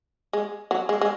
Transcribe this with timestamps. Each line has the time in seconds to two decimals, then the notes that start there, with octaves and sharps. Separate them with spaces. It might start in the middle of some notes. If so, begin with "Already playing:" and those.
0.33 G#3
0.71 F#3
0.89 G#3
1.01 G#3